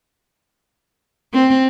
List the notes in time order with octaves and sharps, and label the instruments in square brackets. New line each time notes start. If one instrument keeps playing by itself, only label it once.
[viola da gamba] C4